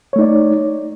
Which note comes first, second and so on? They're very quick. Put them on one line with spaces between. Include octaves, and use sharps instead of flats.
C#5 A3 D#4 D5